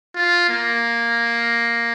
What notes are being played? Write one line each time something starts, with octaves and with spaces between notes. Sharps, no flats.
F4
A#3